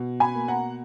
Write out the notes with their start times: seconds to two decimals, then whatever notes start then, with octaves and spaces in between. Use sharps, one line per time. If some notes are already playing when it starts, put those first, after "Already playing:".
Already playing: B2
0.20 G#5 B5
0.34 A#3
0.48 F#5 A#5